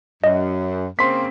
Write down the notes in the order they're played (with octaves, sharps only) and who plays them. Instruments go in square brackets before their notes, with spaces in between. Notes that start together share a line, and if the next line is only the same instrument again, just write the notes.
[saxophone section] F#2 [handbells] D#5
[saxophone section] C#3 A#3 C4 [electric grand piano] C6 B6